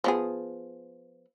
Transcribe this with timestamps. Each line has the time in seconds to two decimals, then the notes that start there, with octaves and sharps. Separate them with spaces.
0.04 F3 B3 G#4